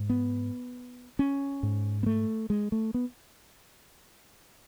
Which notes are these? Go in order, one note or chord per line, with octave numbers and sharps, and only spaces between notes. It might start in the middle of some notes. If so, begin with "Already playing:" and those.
Already playing: G#2
B3
C#4
G#2
B3
A3
G#3
A3
B3